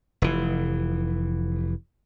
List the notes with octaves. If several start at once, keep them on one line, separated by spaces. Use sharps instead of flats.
F1 E3